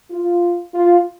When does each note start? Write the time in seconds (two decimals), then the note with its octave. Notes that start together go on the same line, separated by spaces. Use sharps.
0.10 F4
0.74 F4